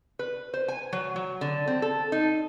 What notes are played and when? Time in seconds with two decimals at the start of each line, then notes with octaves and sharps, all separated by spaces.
0.19 B4
0.54 C5
0.68 G#5
0.93 F#3
1.16 F#3
1.41 D3
1.67 C4
1.82 A4
2.12 D#4